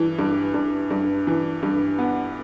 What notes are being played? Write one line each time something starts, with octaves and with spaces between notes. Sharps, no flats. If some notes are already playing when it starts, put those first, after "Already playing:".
Already playing: G2 E3
G2
G2
G2
E3
G2
B3